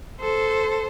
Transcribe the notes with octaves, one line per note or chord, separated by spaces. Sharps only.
A4 C5